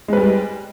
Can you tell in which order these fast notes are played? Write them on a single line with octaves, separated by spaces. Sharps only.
G#3 B4 G3